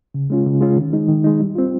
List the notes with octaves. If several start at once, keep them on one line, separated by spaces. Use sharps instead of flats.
C#3
G#3 C#4 F4
C#3
G#3 C#4 F4
D#3
G#3 D#4
D#3
G#3 D#4
G3
C4 F4